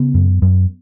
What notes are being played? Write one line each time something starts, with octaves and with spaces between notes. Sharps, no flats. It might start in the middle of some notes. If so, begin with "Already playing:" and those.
Already playing: C#3 B3
F#2
F#2